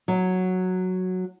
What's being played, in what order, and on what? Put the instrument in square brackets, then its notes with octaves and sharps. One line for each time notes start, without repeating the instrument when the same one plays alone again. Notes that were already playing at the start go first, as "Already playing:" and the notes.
[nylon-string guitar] F#3